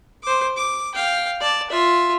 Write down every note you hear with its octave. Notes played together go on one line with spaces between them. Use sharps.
C5 D6
D6
F5 G5
D5 A5
F4 E5